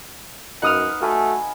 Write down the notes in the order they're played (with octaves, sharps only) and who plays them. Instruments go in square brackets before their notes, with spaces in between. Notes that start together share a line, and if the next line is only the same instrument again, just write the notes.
[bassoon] F#2 [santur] D#4 B4 F5 [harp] F#5 D#6 F6
[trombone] A3 [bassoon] F#4 [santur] F5 G#5 B5